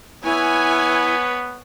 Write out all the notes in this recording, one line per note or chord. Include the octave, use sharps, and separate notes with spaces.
B3 E4 B4 C#5 G#5